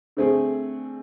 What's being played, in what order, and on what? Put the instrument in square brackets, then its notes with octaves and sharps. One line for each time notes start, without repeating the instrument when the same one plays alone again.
[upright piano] D3 A3 C4 G#4